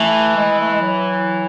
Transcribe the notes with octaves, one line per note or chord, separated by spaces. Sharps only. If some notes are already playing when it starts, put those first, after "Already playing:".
Already playing: E3 A3
G#3
A3
G#3
F#3